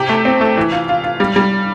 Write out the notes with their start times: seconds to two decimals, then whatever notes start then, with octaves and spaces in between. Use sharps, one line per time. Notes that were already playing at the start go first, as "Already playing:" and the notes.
Already playing: C3 G4
0.09 A3
0.25 C4
0.41 A3
0.57 E3
0.72 F4
0.89 F4
1.04 F4
1.20 G3
1.36 G3